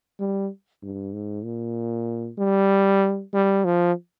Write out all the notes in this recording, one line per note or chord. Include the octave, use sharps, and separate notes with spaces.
G3
G2
G#2
A#2
G3
G3
F3